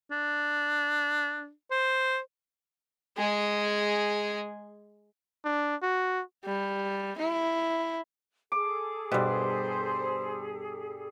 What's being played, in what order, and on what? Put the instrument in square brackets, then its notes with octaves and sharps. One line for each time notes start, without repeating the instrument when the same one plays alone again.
[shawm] D4
C5
[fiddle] G#3 G#4
[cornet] D4
F#4
[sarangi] G3
E4
[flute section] G#4 A4 [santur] D6
[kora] G2 B2 [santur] G3 [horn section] C5